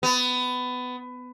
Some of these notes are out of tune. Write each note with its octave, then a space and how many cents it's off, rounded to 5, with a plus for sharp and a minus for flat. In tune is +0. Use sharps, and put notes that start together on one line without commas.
B3 +20